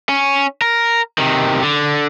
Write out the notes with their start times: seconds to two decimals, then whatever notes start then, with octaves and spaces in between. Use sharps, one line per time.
0.09 C#4
0.62 A#4
1.18 C3 D#3
1.63 D3